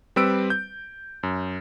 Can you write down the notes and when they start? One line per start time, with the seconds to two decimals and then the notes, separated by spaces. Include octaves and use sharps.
0.16 G3 C4 B4 E6 D7
0.50 G6
1.23 F#2